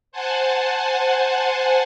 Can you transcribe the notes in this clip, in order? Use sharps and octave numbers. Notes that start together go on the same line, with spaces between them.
C5 F#5 G#5 A5